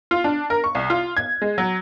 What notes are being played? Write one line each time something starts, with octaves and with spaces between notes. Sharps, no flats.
F4
D4
A#4
C#6
C2
F4
G#6
G#3
F#3